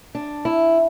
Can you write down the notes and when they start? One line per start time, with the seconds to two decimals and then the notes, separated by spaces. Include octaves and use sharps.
0.15 D4
0.45 E4